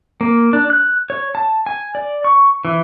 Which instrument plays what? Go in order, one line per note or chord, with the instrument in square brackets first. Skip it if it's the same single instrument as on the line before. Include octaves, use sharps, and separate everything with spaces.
[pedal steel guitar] A#3
D4
F#6
C#5
A5
G#5
D5
C#6
E3